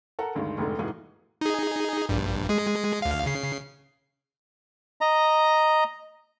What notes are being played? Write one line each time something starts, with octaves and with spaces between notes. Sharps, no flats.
A4 A#4 F#5 A#5
D2 G2 D#3 G#3
F1 D2 G#2 D3
F1 G#2 E3 F#4 G#4
D#4 G#4
A#1 G2
G#3 G#4
D2 F5
C#3 C7
D#5 A#5